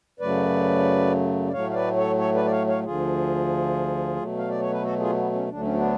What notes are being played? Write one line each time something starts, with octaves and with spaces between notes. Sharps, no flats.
F#2 C#3 F#3 A3 B4 D5
D5
A2 F#3 A3 C#5 F5
F5
B4 D5
A4 C#5
A4 C#5
B4 D5
D5
C#5 F5
C#5 F5
D2 D3 F3 F4 G#4
B2 F#3 A3
F5
D5
C#5
B4
F#4 A4
F4 G#4
B3
C#4
D2 D3 F#3 A3 D4
C#4
B3 D4